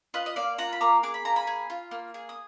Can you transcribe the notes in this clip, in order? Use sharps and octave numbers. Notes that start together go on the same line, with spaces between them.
F4 B4 D#5
D#5
A#3 D5 F5
F4 F#5 A#5
B5
A#3 A#5 D6
G#4 D6
B5
A#3 A#5
G#5 B5
G#4
F4
A#3
G#4
D#6